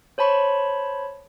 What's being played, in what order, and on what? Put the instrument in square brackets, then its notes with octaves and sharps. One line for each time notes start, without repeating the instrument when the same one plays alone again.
[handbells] C5 C#5 A5 B5 C#6